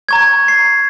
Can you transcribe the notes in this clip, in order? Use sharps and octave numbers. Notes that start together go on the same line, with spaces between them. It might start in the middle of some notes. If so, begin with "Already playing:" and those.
A#5 C#6 G#6
C7